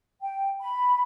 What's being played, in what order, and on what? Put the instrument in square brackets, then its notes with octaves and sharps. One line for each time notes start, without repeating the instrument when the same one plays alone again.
[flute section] G5
B5